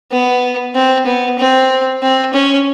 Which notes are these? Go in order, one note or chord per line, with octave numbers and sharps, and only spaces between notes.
B3
C4
B3
C4
C4
C#4